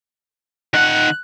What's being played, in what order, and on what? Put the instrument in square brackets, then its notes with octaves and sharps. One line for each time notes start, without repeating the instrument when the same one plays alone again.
[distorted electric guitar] D#3 F#5 [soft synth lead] F#6